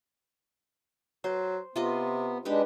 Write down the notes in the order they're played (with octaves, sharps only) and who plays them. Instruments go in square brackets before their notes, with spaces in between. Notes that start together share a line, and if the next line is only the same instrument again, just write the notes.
[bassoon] F#3 [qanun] C5
[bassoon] C3 [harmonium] B3 [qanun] F4 D#5
[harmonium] G#3 D4 [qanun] D#4 G4 B4